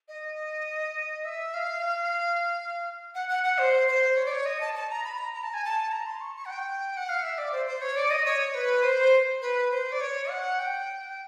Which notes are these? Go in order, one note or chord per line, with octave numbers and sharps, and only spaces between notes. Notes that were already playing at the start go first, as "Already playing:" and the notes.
D#5
E5
F5
F#5
F#5
F#5
C5
C5
C#5
D5
C#5
D#5
A5
A5
A#5
B5
A#5
A#5
A5
G#5
A5
A#5
C6
C#6
C#6
F#5
G5
F#5
F5
E5
D5
C5
C5
C#5
D5
D#5
C#5
B4
C5
B4
C5
D5
C#5
F#5
G5